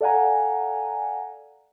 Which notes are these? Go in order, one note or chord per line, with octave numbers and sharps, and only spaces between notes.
A4 D5 F5 F#5 G#5 A#5